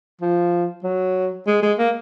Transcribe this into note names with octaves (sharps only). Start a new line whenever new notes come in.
F3
F#3
G#3
G#3
A#3